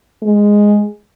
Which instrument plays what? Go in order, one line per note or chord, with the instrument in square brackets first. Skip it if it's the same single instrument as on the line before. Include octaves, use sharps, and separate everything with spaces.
[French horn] G#3